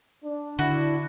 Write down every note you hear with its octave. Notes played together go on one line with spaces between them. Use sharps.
D4
D3 E4 F#4